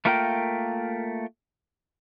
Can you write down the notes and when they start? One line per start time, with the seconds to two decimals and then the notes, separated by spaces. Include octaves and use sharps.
0.05 A3 A#3 F4 A#4 F5 G5